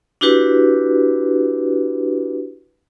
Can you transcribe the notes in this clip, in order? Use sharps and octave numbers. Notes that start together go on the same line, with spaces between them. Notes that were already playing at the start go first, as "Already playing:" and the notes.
D4 E4 F#4 G4 B4